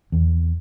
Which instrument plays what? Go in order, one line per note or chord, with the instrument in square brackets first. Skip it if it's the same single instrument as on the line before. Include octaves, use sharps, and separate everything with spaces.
[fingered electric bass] E2